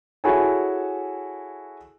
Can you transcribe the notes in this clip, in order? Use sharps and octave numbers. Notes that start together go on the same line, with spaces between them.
E4 F#4 G#4 A4 C#5 G#5